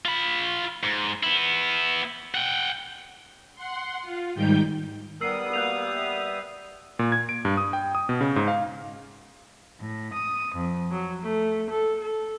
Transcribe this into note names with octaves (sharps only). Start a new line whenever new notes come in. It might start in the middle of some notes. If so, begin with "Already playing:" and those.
F4 B5
G#2
B3 E4
F#5 G5
F#5 C6
F4
G#2 D#3 G3 D#4 G5 G6
G3 B3 A#4 F#5 D#6 E6 C7
A#3 F#4 F#6 G6 F7
E5
A#2
G#6
D7
G2
D#6
G5
D#6
B2
C#3
G#2
F5
A2
D#6
F2
F#3
A3
A4
A4